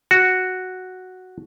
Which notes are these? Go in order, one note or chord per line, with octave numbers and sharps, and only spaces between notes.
F#4